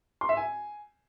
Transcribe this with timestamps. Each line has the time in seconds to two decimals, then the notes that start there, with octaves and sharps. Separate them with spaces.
0.21 C6
0.29 E5
0.37 G#5